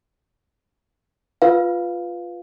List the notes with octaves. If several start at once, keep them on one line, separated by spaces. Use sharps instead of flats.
F4 B4 F5